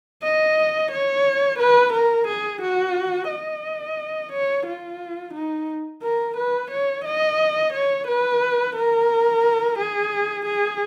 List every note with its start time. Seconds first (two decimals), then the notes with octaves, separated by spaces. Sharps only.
0.23 D#5
0.92 C#5
1.59 B4
1.93 A#4
2.27 G#4
2.62 F#4
3.30 D#5
4.32 C#5
4.66 F4
5.34 D#4
6.03 A#4
6.37 B4
6.71 C#5
7.05 D#5
7.73 C#5
8.07 B4
8.76 A#4
9.78 G#4
10.46 G#4